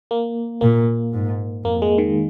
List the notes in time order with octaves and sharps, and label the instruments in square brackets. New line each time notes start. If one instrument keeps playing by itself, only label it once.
[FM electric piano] A#3
[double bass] A#2 [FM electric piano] A#3
[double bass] G#2
[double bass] F2 [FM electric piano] A#3
[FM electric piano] G#3
D#3